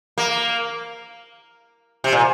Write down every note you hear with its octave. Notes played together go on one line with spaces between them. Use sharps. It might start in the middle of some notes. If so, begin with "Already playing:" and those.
A#3
C3
A#2